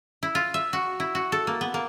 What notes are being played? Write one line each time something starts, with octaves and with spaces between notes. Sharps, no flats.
E4
F4
E5
F#4
E4
F#4
A4
A#3
B3
A#3